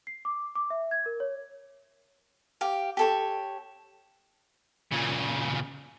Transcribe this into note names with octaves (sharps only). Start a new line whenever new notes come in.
C7
D6
D6
E5
G#6
A#4
C#5
G4 F5
G4 A4 C#5
A#2 C#3